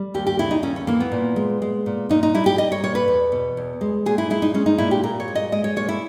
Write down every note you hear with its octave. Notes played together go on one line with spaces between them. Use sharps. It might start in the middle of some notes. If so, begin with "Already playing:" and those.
Already playing: G3
D#2 G4
G4
C#3 E4
D#4
D#2 C#4
C#4
E3 A#3
B3
A#2
G#3
G#3
A#2
A#2 D#4
D#4
G3 E4
G4
G3 D#5
C#5
A#2 C#5
B4
E2
B2
E2
G#3
A#2 G#4
E4
G#3 E4
D#4
G#3 C#4
D#4
A#2 E4
G4
A#2 A#4
C#5
G#3
D#5
G#3 D#5
C#5
A#2 C#5
E4